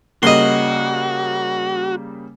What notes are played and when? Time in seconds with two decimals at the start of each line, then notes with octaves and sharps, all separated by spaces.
0.23 C#3 G3 A#3 F#4 D#5 C6